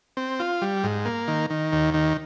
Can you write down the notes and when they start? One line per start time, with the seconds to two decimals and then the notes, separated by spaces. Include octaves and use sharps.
0.17 C4
0.40 F4
0.62 G3
0.84 G#2
1.05 A#3
1.28 D#3
1.50 D#3
1.72 D#2
1.94 D#3